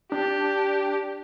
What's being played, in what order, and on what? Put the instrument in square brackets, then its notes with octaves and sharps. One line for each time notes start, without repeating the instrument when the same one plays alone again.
[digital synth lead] D4 [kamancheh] G4